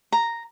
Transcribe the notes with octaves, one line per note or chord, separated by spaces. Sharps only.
A#5